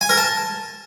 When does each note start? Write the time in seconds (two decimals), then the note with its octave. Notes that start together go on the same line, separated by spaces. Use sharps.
0.01 G#5
0.09 A#4
0.17 A5